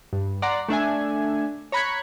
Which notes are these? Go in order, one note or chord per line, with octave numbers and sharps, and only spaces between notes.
G2
D5 F#5 A#5 C6
A3 D4 E5 G#5
C#5 A#5 B5 F#6 G#6 C#7